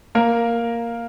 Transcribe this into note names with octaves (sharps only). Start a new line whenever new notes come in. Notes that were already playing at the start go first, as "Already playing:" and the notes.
A#3 A#4